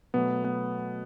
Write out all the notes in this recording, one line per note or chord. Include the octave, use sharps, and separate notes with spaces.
B2 F#3 A3 B3
B3